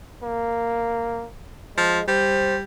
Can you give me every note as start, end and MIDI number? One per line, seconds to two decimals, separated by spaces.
0.23 1.28 58
1.77 1.99 53
1.77 2.03 56
2.08 2.63 55
2.08 2.57 72